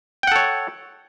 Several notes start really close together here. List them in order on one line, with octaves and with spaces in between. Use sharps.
G5 F#5 A4 C#5